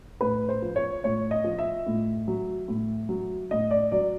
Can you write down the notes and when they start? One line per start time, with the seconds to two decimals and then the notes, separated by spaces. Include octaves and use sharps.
0.21 A2 B4
0.49 C5
0.62 F3
0.76 C#5
1.04 A2 C#5
1.31 D#5
1.44 F3
1.59 E5
1.86 A2
2.28 F#3
2.68 A2
3.09 F#3
3.51 A2 D#5
3.71 D5
3.92 F#3 D5